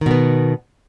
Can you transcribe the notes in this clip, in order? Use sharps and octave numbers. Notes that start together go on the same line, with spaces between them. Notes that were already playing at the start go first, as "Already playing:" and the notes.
B2 D#3 B3